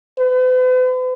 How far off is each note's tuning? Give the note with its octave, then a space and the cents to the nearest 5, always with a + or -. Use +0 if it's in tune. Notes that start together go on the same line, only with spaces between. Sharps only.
B4 +45